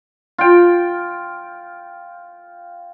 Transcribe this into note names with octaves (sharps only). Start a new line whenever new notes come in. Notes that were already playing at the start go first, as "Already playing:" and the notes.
F4 G5